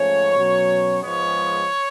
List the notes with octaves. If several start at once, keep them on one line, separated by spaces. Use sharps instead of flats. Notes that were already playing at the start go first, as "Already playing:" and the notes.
Already playing: G#2 F3 A3 C#4 C#5
B2 F#3 C#4
G#2 F3 G#3 B3 C#5